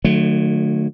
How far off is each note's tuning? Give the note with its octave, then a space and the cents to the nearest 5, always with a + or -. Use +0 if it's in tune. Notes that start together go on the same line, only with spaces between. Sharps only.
D3 +40 F#3 -25 A3 +0